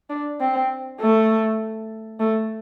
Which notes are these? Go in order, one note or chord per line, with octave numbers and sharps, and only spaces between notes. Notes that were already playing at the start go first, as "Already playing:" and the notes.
D4
C4
A3
A3